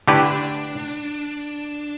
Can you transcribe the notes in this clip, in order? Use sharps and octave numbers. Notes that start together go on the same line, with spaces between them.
D3 A3 D4 E4 G4 B4